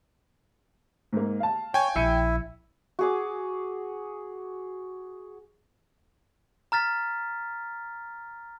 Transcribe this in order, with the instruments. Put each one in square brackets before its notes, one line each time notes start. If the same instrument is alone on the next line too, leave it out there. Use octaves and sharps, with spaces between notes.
[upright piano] G#2 A#3
F5 A5
[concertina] C#5 [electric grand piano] G5 G#5
[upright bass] A#1 [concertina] E4 [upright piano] E6 C#7 D#7
[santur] F#4 G#4 D6
[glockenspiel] A#5 F6 A6 B6